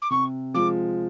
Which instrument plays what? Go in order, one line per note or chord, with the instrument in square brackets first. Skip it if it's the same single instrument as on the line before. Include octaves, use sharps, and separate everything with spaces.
[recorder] D6
[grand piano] C3 [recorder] C#6
[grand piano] F3 G#3 [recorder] D6